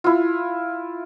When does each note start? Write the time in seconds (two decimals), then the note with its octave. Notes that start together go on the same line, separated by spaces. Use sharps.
0.04 E4 F4